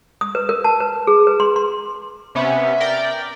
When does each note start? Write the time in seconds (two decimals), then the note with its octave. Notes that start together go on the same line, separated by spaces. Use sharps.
0.21 D#6
0.35 B4
0.49 A#4
0.64 A5
0.80 B4
1.07 G#4
1.27 B4
1.40 C6
1.56 C6
2.35 C3 B3 C#4 E5
2.80 A#4 D5 G5